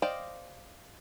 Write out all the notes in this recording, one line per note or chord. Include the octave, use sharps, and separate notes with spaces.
C5 D5 D#5 F5 G5